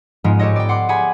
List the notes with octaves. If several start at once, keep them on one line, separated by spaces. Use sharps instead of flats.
G#2 F3 G#3 B3 F4
G4 A4 C#5 D#5
D5 G5
F#5 C6 D6
G#4 F#5 G#5 B5